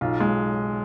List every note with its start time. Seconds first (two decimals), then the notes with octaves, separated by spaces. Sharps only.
0.01 B1 F4
0.20 G#3